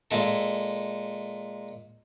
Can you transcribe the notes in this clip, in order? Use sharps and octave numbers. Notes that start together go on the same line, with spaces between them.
A#2 G#3 A4